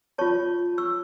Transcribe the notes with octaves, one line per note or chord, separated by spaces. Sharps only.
F4 C#5 A5 C#6
C#6 E6